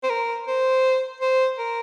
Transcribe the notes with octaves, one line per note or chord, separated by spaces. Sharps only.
C5
A#4
C5
C5
A#4